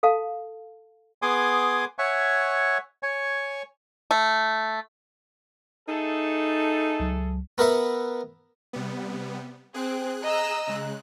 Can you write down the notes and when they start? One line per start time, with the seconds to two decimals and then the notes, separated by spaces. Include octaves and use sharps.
0.03 A4 F5 A5
1.22 B3 G#4 G#5 C6 D6 D#6
1.98 C#5 E5 F#5 G#5 C#6
3.03 C#5 G#5 C#6
4.11 A3
5.88 A3 D#4 G#4 A4
7.00 C#2 F#3
7.58 B3 A#4 B4 E5 F#5
8.73 C3 G3 B3
9.74 C4 G#4 F#6
10.23 D#5 A#5 E6
10.67 C#3 G#3 F#6